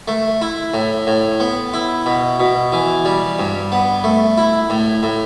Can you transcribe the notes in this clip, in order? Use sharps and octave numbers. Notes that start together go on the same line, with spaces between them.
A3
E4
A2
A2
B3
E4
B2
B2
E3
G3
G2
B3
A3
E4
A2
A2